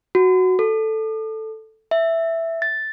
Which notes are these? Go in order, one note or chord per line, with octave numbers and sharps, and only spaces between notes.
F#4
A4
E5
A6